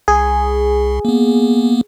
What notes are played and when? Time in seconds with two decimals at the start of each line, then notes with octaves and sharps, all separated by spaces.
0.08 C2 G#4
1.05 A#3 B3